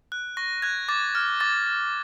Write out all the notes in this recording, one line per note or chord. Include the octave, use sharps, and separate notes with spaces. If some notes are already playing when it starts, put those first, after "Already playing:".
F#6
C#6 A#6
F#6 G#6
D6 A6
F6
D6 A6